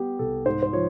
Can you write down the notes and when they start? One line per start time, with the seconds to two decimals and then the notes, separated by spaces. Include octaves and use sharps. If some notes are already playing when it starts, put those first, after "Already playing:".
Already playing: G3 B3 G4
0.19 C2 A4
0.46 G#2 C5
0.63 C5
0.73 F3 C#5